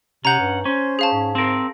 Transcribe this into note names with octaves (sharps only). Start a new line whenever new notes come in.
C3 C#4 F#5 A#5 G6
G2
C#4 C5
G#4 F5 A5
G#2
C4 A#4